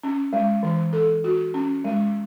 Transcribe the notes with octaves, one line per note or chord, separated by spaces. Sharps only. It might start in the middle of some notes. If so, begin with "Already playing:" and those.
C#4
G#3
E3
A4
F#4
C#4
G#3